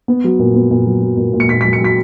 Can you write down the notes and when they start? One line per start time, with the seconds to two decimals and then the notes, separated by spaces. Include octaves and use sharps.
0.08 B3
0.24 F#3
0.39 A#2
0.54 B3
0.71 A#2
0.86 F#3
1.02 F#3
1.17 A#2
1.33 A#2
1.40 C#7
1.49 A#2 B6
1.61 B6
1.65 F#3
1.73 C#7
1.80 F#3 B6